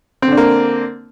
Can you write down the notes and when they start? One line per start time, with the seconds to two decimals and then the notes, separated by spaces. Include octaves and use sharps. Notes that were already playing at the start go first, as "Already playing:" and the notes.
0.22 C4
0.27 D3
0.32 D4
0.37 A#3